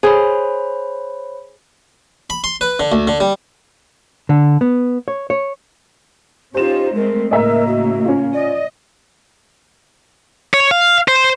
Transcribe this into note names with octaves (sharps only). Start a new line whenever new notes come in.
G#4 C5 C#5 B5
B5
C6
B4
D3
D2
D3
G3
D3
B3
C#5
C#5
C#4 D#4 F4 G4 C5 E7
G#3 A3 C4 A#4
A2 C#3 A#3 A#4 D#5 E5 A#5
F#4
C#4 F4
D5 D#5
C#5
F5
C5